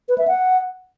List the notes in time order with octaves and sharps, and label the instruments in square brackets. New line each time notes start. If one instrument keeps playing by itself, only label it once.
[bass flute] B4
E5
F#5